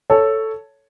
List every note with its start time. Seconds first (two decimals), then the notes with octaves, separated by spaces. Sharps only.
0.10 A4 C#5